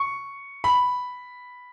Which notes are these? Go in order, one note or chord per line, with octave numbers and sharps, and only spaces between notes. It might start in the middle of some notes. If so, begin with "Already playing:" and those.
Already playing: C#6
B5